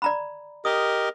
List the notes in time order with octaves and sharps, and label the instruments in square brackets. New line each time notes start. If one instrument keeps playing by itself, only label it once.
[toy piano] D5 A#5 B5
[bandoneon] G4 A#4 D#5 [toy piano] D#6